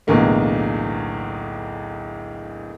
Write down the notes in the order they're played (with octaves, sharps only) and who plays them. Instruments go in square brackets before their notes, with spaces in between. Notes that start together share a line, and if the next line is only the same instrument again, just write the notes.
[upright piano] B1 E2 A2 D3 A#3 B3